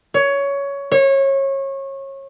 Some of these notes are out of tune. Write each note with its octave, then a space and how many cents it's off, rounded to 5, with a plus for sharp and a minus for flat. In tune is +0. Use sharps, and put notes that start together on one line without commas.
C#5 +15
C#5 -25